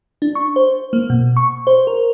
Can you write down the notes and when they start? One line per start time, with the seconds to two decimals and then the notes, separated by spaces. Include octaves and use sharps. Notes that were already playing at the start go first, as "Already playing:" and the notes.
0.22 D4
0.35 C#6
0.56 C5
0.93 A#3
1.10 B2
1.37 C#6
1.67 C5
1.87 A#4